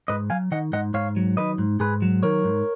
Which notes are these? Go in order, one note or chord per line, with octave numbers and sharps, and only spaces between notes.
G#2 B4 D#5
F#3 F5 G#5
D#3 D#5 F#5
G#2 D#5 F#5
G#2 C#5 F5
F#3
D#3 B4 D#5
G#2
G#2 G#4 B4
F#3
D#3 A#4 C#5
G#2